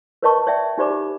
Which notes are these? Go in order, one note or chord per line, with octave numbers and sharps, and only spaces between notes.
A#4 B4 C#5 D#5 A5 C#6
C#5 D5 E5 G5
D#4 G4 C5 D5 B5 D6
G4